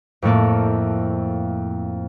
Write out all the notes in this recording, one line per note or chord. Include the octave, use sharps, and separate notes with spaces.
F2 A2 A3 A#3